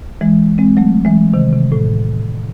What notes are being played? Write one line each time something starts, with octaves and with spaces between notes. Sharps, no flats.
E3 G#3
G#3 C4
F#3 A3
E3 G#3
C3 D#3
C3
A2